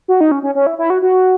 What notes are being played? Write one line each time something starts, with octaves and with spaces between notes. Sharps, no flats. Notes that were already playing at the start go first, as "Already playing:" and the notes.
F#4
D#4
C#4
C#4
C#4
E4
E4
F#4
F#4